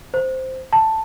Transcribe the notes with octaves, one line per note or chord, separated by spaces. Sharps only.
C5
A5